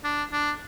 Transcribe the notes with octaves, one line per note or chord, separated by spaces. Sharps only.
D4
D4